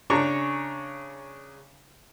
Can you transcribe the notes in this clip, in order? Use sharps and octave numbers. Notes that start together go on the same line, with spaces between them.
C#3 D4 A#5 C#6